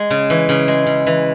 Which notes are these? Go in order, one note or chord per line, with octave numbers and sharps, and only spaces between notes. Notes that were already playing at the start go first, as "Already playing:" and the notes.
Already playing: G#3
C#3
E3
C#3
G#3
C#3
E3